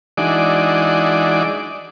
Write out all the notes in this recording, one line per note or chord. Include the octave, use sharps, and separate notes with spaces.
E3 G#3 D4 D#4 F#4 D5